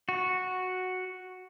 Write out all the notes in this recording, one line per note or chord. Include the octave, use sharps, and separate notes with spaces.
F#4